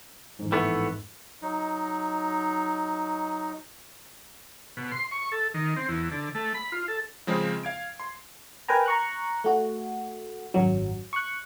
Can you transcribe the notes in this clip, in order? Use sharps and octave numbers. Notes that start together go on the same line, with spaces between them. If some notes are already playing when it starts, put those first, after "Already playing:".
A1 F2 G#2
E3 A3 B3
F#3 D#4
B2
C6
C#6
A4
D#3
C4
E2
D3
A3
B5
F4
A4
C#3 F3 G#3 C4 G#4
F5 G#6 D7
C6
A#4 B4 G5 G#5 A#5
A#5 C#6 F#6
A3 F#4
G#1 F#2 F#3
C#6 F#6